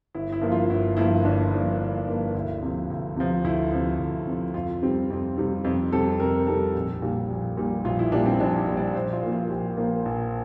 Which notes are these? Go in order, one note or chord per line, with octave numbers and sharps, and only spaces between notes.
G1 E4
E4
G2 F3 A#3
F4
G1 E4
G2 F3 A#3 E4
G1 D4
G2 F3 A#3
G1
G2 F3 A#3
D2 E4
C3 F3
D2
C3 F3
D2 E4
C3 F3
D2
C3 F3
F2 F4
C3 G3 C4
F2
C3 G3 C4
F2
C3 G3 C4 A4
F2 A#4
C3 G3 C4 A4
A#1
A#2 G3
A#1
A#2 G3
A#1 F4
E4
A#2 G3 D4
C4
A#1 D4
A#2 G3
D5
A#1 C5
F4
A#2 F3 A#3
F4
A#1 G4
A#2 F3 A#3
A#1